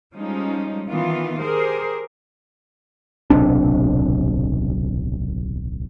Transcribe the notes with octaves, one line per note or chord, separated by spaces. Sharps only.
F3 G3 G#3 C#4 D#4
D#3 E3 B3 F4
G4 G#4 A#4 C5
D1 B1 C3 D4